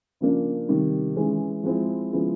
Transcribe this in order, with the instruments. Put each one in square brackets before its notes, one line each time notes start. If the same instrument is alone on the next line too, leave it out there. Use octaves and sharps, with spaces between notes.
[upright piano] C#3 F3 A#3 D4
C3 D#3 G3
E3 G#3 C#4
F3 G#3 C4 E4
C#3 F3 G#3 B3 E4